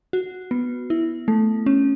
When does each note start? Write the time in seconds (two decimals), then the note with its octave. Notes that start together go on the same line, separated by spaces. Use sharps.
0.13 F#4
0.51 B3
0.90 E4
1.28 A3
1.66 C#4